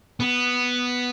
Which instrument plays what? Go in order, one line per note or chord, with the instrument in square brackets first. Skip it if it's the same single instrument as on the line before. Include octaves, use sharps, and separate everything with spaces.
[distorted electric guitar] B3